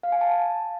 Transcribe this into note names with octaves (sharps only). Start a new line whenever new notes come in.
F5
G#5
A5